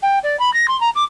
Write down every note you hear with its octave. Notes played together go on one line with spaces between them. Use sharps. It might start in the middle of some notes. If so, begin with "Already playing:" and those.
G5
D5
B5
A#6
C6
A#5
D6